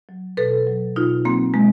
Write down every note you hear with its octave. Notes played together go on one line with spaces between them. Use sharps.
F#3
B2 A4 B4
F#3
B2 D#4 F4
F#3 A#3 C4
B2 G#3 A#3